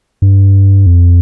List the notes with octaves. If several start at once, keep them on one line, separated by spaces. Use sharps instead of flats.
G2
F2